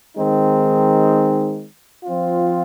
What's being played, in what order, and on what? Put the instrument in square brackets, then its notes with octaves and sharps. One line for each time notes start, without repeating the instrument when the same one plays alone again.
[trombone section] D#3 G#3 C4 D#4
F3 C4 F4